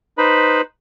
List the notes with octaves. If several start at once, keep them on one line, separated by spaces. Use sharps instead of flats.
D#4 B4 C5 B5